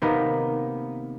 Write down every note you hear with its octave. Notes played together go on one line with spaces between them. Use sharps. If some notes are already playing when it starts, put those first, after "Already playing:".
C3 D#3 A#3 B3